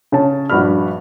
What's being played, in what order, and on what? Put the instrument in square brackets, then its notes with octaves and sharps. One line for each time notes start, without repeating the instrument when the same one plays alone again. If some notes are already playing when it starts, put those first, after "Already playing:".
[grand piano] C#3 C#5 A5
A#1 G2 F#4 B5 F6